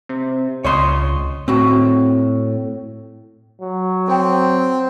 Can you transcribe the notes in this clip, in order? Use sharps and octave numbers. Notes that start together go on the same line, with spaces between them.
C3
C#2 C#5 D#5 C6
A2 C4 F#4
F#3
C4 A4 G5